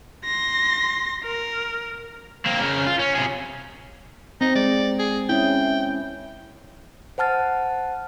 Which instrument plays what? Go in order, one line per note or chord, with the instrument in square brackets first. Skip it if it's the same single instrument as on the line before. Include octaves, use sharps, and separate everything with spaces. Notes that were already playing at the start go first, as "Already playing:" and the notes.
[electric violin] C6 A#6
A#4
[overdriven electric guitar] A#3 C4
C#3 A#4
F4
C#4
C3 G#4
[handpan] C4 [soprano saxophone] D#4
[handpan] G#3 [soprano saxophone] D5
[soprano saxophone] G#4
[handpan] C#4 E4 [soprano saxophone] G5
[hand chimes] C5 F#5 A5 F6 A6